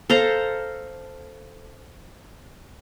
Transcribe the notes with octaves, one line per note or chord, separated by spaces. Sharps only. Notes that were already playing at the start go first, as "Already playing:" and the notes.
A4 C5 F5 A#5